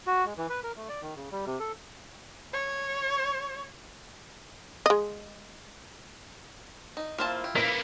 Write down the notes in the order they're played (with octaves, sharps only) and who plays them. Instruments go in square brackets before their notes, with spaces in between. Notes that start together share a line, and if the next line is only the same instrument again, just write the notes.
[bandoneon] F#4
G#3
E3
B4
A#4
A3
D5
D#3
C#3
G3
C3
A4
[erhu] C#5
[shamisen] G#3 D#5
[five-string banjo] D#4
[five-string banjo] A#3 C5 A5 [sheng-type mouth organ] E4 F4
[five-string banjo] G4
[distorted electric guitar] A#3 B3 [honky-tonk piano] B6